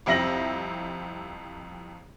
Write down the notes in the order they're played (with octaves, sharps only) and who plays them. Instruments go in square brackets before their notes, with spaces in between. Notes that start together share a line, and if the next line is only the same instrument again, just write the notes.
[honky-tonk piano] C2 F2 C4 E5 A#6 F#7